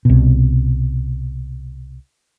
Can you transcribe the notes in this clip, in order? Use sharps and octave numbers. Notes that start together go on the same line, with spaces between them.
C2 B2